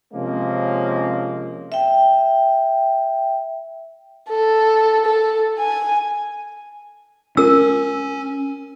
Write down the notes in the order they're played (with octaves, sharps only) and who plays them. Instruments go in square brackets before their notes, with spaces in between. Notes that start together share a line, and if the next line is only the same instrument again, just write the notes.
[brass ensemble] C3 F3 G#3 A#3 C#4
[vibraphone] E5 G5
[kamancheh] A4
A4
G#5
[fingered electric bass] C#4 [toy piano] A#4 E6